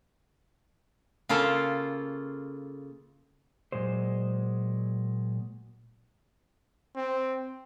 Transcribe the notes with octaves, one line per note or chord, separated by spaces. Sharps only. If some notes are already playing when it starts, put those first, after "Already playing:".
C#3 A#3 F4 A4
A#2 F#3 G#3 C5
C4